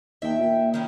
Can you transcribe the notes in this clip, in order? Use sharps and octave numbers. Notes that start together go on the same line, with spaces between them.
D#2 E5 G5
A#2
D#3 C#4 E4